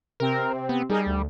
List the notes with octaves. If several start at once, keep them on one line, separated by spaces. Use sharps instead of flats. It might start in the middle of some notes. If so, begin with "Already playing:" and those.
C3 C4 A#4
B3
G3 D#4 G#4 A#4
D2